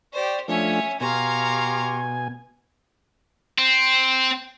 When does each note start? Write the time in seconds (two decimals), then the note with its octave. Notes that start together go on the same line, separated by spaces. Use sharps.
0.13 G4 C5 D5 C#6
0.48 F3 A3 C#4 D4 C#5 E5 G#5
1.01 B2 G4 F5 G#5 A#5 C6 C#6
3.58 C4